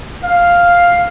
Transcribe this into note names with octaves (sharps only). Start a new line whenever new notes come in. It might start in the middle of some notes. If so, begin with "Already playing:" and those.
F5